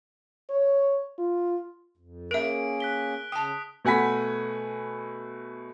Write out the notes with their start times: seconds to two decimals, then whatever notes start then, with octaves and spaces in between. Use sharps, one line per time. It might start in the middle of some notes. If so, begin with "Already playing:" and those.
0.50 C#5
1.19 F4
1.97 F2
2.31 A#3 C#4 G#4 A#4 E5 D7
2.80 F#6 B6 G7
3.32 C#3 G5 A5 D#6
3.85 B2 A3 F#5 G#5 B5 B6